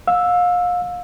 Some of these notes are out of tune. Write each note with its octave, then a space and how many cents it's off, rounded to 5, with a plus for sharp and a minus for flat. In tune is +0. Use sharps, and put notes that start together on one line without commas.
F5 +30 E6 +0